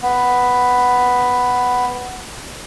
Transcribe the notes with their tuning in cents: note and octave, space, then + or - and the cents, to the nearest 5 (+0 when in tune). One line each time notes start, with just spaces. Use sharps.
B3 +5